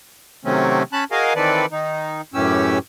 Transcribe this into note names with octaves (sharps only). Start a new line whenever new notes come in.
C3 D#3 F#3 A3 C4 C#4
C#4 A5 B5 F#6
F#4 G#4 A#4 D#5 F5 G#5
D#3 E3 C4 A4 B4 D5
D#3 D#4
F#2 A2 E3 C#4 G4 E6